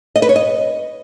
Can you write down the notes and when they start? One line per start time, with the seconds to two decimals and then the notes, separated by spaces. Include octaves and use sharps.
0.16 D#5
0.22 B4
0.29 C#5
0.36 D#5